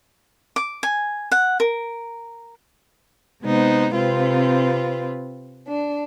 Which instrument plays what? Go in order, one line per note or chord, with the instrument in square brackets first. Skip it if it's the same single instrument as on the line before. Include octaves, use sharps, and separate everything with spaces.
[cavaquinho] D6
G#5
F#5
A#4
[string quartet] C3 G#3 B3 D#4 C5
C3 C4 F4 B4
D4